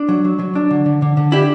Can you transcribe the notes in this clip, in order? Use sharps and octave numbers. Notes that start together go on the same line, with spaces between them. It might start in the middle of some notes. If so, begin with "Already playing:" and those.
Already playing: D4
F#3
F#3
F#3
D4
D3
D3
D3
D3
D4 E4 G4